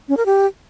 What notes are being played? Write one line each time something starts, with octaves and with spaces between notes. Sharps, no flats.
C#4
A#4
G4